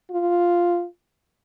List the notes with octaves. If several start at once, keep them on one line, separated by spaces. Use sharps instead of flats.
F4